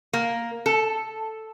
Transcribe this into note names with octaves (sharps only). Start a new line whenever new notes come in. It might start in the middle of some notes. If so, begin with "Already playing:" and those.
A#3
A4